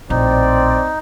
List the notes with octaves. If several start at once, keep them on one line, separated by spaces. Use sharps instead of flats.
A#1 A2 C4 D#4 D5